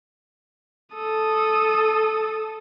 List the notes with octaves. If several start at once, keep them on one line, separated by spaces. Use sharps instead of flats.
A4 D#6